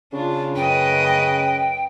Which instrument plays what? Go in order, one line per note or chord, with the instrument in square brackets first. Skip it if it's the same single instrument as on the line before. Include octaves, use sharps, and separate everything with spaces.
[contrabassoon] C#3 [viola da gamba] D4 F4
[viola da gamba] F#2 B4 D#5 [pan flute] G5